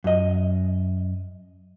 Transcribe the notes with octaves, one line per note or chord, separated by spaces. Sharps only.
F#2 D#5